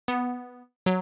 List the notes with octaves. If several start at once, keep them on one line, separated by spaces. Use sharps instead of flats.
B3
F#3